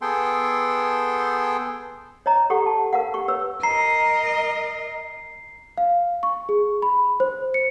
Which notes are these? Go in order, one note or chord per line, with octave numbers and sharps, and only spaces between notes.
B3 G#4 A4 G5 C6
C#5 D#5 A#5
G4 A4 F#5 C#6
A5
A#4 F5 F#5
G4 C#6
B4 C#5 E6
A#4 D#5 A#5 C7
F5
C#6
G#4
B5
C5
C#7